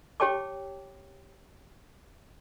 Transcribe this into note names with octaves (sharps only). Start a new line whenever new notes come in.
G4 C#5 G5 A5 D6